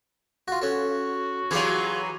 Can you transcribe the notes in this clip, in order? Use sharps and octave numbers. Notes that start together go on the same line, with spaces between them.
F4 F#4
C#4 F#4 A4
E3 F#3 F4 G4 G#4